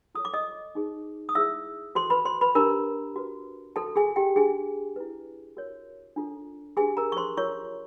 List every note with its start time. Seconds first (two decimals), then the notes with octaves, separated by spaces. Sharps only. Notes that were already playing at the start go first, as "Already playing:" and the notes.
0.15 F4 A4 C#5 D#6
0.25 D6
0.34 D#5 D#6
0.75 D#4 G#4 C5
1.29 D#6
1.35 E4 G#4 C5 E5 E6
1.95 F#4 A4 C5 C6
2.10 B4 B5
2.25 C5 C6
2.41 B4 B5
2.55 D4 G4 A#4 C5 A#5
3.16 F#4 B4
3.76 F#4 A4 C5 A5
3.96 G#4 G#5
4.16 G4 G5
4.36 D4 G4 G#4 C5 G#5
4.96 E4 G#4 B4
5.57 F#4 A#4 C#5
6.16 D4 F4 A4
6.77 D4 G4 G#4 B4 G#5
6.97 A#4 A#5
7.12 C#6
7.17 C5 C6
7.37 F4 A#4 C#5 C#6